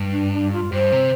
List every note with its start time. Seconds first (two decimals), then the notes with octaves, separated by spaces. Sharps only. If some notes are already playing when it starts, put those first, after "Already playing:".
Already playing: G2
0.11 D4
0.32 D4
0.52 F4
0.72 G2 C5
0.92 C3